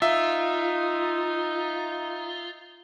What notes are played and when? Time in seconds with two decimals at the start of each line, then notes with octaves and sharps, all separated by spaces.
0.02 D#4 F4 E5